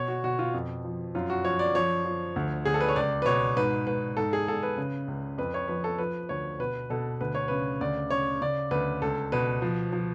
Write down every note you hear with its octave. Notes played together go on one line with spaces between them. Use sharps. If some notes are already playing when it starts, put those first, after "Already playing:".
Already playing: B2 C#5
F#4
B2 F#4
F4
F2
F3
F#2 F4
F#4
F3 C#5
D5
F3 C#5
F3
D2
D2 G#4
A4
B4
C#5
C#2 D5
B4
B2 C#5
G#2 B4
G#2 B4
G#2 A4
G#4
G#2 A4
B4
C#3
C#2
F2 B4
C#5
F3 B4
A4
F3 B4
D2 C#5
B2 B4
B2 A4
D2 B4
C#5
C#3 B4
D2 D5
C#3 C#5
C#3 D5
D2 B4
C#2 A4
B2 B4
F3
F3